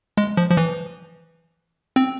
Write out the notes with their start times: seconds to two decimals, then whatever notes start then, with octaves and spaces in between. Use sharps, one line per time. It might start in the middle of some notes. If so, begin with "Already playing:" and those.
0.17 G#3
0.37 F3
0.51 F3
0.57 E3
1.96 C4